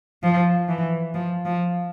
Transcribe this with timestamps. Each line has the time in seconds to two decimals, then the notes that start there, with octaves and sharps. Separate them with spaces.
0.23 F3
0.69 E3
1.14 F3
1.45 F3